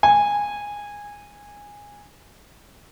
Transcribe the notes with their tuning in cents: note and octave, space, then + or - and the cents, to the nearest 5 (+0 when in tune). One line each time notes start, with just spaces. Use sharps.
G#5 -15